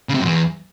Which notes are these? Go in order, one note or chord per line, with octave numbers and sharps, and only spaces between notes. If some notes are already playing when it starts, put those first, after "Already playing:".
C#3
C3
F#2
E2